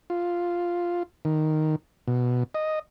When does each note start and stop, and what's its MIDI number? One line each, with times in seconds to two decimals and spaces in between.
0.10 1.03 65
1.25 1.76 51
2.08 2.44 47
2.55 2.79 75